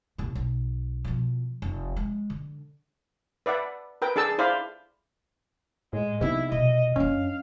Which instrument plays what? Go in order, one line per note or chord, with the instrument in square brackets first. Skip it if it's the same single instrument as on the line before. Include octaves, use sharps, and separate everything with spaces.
[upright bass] C2 A#2
B1
B2 F3
F1
G#3
D3
[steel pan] B4 D5 E5 F#5
A#4 B4 G5
D4 G#4 A4 A5 E6
E4 C5 D5 F5 B5
[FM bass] A2 [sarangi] G#3
[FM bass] C3 [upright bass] B3 D#4 [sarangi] E4
[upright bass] B2 [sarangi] D#5
[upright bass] F#2 D4 [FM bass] C#4 [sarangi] F5